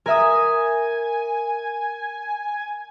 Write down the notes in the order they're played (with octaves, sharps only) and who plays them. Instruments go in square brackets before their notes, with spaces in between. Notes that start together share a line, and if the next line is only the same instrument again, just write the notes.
[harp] A#4 E5 D#6 [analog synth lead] G#5